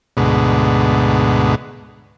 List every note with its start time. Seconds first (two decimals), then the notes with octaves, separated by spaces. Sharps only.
0.17 D2 G#2 B2